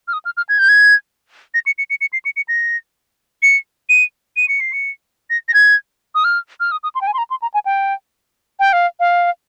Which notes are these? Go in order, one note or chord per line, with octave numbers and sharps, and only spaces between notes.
F6
D#6
F6
F6
G#6
G6
G#6
A#6
C#7
C#7
C#7
C#7
C7
C#7
C#7
A#6
C#7
D#7
D#7
C#7
C7
C#7
A#6
A#6
G#6
D#6
F6
F6
D#6
D#6
C6
G5
G#5
C6
A#5
C6
A#5
G#5
G5
G5
F5
F5